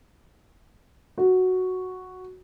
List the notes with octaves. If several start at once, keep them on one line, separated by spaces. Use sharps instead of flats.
F#4